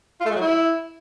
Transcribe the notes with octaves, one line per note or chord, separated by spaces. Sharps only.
F4
A3
G#3
F#3
E4